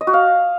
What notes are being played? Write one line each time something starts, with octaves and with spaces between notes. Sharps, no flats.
D#5
F#4
F5